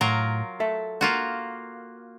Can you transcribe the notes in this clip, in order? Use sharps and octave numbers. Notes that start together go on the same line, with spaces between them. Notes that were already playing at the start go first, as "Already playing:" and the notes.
A2 F#3 F4 A#4
A4 E5
A#3 F4 F#4